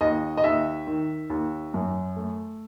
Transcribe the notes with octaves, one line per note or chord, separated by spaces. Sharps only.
D#2 D#5
D#5
D#2 E5
D#3
D#2
F#2
A3